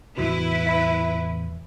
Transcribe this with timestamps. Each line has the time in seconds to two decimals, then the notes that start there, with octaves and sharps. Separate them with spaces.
0.18 E2 A2 C3 E4 F#4 B4
0.66 E5 B5